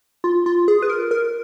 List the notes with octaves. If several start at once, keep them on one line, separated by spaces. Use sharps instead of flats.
F4
F4
G#4
B4
A#4
A#4